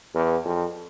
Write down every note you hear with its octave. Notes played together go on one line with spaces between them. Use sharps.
E2
F2